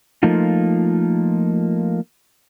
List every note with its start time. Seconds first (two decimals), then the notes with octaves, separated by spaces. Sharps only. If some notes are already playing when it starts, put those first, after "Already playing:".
0.23 F3 A3 A#3 D#4 F4